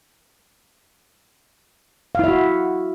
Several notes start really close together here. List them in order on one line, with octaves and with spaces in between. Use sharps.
F5 E4 E5 F#4